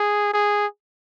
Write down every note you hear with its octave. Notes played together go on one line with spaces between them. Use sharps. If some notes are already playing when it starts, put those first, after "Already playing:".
Already playing: G#4
G#4